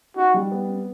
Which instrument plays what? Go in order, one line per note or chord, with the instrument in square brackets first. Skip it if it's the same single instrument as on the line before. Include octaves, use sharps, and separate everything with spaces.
[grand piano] D#4 [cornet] F#4
[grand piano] G3
B3
C4